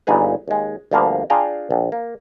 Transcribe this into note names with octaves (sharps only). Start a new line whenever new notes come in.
G1 A#2 D#4 G#4 B4
D#2 G#3
D2 G2 F3 A#3 B3 F5
D4 F4 G#4 F5 G5 A#5
A#1
A#3